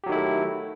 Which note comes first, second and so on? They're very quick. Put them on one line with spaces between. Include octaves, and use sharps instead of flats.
G4 F#3 D#3 E4 A3